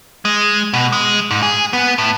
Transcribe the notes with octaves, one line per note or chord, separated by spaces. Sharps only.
G#3
B2
G#3
G#2
G#4
B3
A2